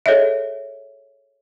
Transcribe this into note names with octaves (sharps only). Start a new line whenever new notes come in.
G#4 A4 C#5 D#5 E5